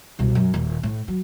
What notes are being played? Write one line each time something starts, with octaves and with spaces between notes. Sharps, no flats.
C2 B2
F#2
D#1
A2
F#3